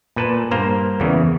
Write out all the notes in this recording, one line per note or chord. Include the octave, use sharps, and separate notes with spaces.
A#2 B4 A5
G2 A#3 C5 A#5
E2 C#3 E3